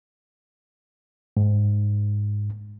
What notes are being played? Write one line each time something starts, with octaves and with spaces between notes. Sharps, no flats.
G#2